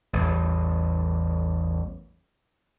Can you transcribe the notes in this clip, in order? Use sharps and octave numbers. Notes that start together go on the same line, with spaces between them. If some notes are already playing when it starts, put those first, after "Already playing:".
A1 E2 G3